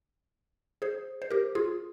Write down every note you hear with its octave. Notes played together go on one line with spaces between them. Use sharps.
G#4 C5
C5
G4 A#4
F4 G#4